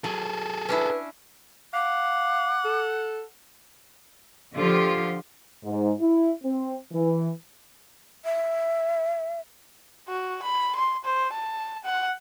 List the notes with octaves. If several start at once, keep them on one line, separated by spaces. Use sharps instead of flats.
F#3 G#4 A4
C#4 D4 E4 B4
F5 F#5 D6
A4
D3 F3 F4 G4
G#2
E4
C4
E3
E5
F#4
B5
C6
C5
A5
F#5